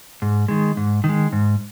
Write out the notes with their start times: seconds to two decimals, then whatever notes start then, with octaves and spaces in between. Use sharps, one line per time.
0.22 G#2
0.48 D#3 G#3
0.77 G#2
1.04 D#3
1.09 G#3
1.32 G#2